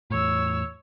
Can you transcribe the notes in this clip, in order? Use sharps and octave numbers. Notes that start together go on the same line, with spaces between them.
E2 A2 C#5 E6